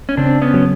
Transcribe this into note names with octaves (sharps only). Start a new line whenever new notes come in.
C#4
C#3 C4 D4
B3 C#4
F#3